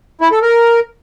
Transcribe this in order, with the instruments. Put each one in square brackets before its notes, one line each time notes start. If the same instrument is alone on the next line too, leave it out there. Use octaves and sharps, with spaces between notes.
[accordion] E4
A4
A#4